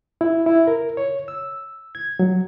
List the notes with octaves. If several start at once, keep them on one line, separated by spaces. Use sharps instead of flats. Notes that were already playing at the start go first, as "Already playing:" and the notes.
E4
E4
A#4
C#5
E6
G#6
F#3